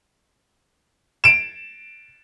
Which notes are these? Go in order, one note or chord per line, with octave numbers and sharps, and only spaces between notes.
D7 E7